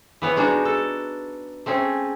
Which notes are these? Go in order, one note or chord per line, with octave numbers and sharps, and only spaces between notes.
E3 B3 C#5
G#3 D4 D#4 F#4
A4
A3 C4 C#4 G#4